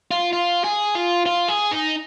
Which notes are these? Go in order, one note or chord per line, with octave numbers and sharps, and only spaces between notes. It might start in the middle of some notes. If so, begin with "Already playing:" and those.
F4
F4
G#4
F4
F4
G#4
D#4